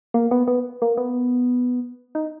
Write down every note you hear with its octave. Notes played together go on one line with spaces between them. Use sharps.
A#3
B3
B3
A#3
B3
D#4